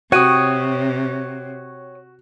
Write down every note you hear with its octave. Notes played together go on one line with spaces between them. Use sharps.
C3 F#4 C#5 G5 C#6 D#6 D#7